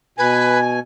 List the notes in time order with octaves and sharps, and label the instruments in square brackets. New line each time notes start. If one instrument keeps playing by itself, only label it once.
[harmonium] B2 G#5 [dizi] B4